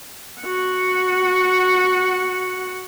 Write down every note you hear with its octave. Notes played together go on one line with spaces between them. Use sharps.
F#4 F#5